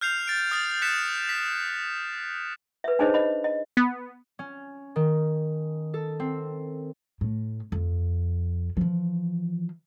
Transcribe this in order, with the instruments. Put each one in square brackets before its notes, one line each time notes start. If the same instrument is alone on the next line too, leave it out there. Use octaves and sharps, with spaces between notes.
[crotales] F6 G6 C7 F7
A6 D7
D#6 F6 A6
F#6 B6 C#7 E7
B6
[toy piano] B4 E5
D4 D#4 G#4 C5 C#5 D#5
D#5 B5
D#5
[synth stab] B3
[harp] C#4
D#3
A4
C4
[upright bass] A2
F2
E3 F3